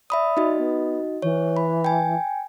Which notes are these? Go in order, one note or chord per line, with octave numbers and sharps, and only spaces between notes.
D5 E5 B5 D#6
D#4 F#4 D#5
B3
E3 C#5
B5
G5 G#5